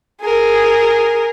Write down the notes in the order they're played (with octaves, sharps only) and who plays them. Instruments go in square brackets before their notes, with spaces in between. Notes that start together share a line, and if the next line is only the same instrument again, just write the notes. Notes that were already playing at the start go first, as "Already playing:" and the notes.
[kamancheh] G#4 A#4